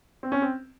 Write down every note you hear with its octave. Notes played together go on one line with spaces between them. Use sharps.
C4
C#4
C4